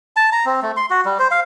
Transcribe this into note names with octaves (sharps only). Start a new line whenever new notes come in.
A5
A#5
C4
A3
C6
F#4
G3
C5
F5